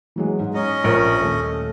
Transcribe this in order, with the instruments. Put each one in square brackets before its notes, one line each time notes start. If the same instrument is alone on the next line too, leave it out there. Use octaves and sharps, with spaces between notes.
[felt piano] E3 F#3 G#3
G#2
[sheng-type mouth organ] C#4 D#5 [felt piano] C#5 A#5
[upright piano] A#1 A#4 F6
[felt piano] D#1 [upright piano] A3